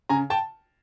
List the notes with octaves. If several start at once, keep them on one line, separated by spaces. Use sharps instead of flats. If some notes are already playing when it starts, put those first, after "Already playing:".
C#3 G#5 A#5
G5 A5